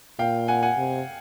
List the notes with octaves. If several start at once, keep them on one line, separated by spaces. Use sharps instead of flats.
A#2 F5 G5
F#5 G#5
F#5 G#5
C3